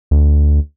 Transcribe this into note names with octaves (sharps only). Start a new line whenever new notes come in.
D2